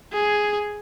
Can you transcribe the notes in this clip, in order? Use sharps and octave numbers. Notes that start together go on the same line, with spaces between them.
G#4